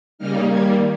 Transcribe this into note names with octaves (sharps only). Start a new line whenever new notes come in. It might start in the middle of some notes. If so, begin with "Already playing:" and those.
C#3 G3 A#3 D#4 F6
D#3 G3 A#3 G#6